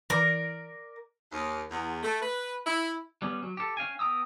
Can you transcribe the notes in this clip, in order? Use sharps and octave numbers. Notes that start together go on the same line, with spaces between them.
E3 A#4 D5
D#2
E2
A3
B4
E4
G3 B3 C#4
F#3
G4 A4
C#4 F5 G5 G#5
B3 G5 A#5 D#6 E6